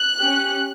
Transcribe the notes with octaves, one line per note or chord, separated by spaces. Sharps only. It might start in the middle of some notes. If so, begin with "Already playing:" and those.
Already playing: F#6
C#4 G4